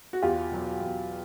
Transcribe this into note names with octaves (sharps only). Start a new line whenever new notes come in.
F#4
E2 F4 G4
B2 F#3
E2